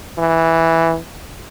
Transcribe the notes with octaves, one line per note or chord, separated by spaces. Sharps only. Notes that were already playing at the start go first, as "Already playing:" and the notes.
E3